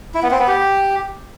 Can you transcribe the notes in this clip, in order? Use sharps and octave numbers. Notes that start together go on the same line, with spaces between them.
E4
B3
C4
B3
G4